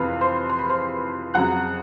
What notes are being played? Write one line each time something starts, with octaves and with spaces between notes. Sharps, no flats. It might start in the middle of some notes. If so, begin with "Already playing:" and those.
Already playing: F2 C3 E3 F4 B4 F5 B5
C5 C6
C6
B5
C5 C6
F2 C#3 F#3 F#5 F#6